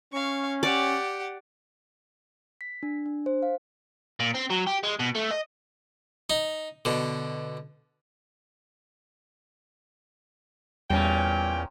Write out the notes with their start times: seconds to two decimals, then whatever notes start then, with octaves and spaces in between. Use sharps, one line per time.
0.12 C#4 F5 C#6
0.63 G4 D5 F#5
2.61 B6
2.83 D4
3.06 D4
3.26 C5
3.42 F5
4.20 A#2
4.35 C4
4.50 F#3
4.67 G4
4.83 G#3
4.99 B2
5.15 A3
5.31 D#5
6.30 D#4
6.85 B2 D3
10.90 E2 A#2 G3 C#4 G5